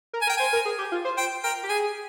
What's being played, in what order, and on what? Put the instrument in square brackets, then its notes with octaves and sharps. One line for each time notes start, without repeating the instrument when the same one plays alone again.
[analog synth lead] A#4
[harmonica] G#5
[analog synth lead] A#4 [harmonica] G5
[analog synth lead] C5 [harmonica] G#5
[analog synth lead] A#4
G#4
G4
F4
C5
[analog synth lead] C5 [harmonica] G5
[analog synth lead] A#4 [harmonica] G5
[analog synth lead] G4
[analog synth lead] G#4 [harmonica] G#5